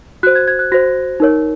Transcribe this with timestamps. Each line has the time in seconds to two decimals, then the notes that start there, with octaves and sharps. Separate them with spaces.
0.23 F#4 F#6
0.27 C5
0.35 G#6
0.48 G#6
0.59 F#6
0.72 F#4 C5 A#6
1.20 D#4 A#4 C#5